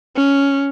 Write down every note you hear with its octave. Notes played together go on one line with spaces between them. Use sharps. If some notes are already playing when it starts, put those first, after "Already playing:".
C#4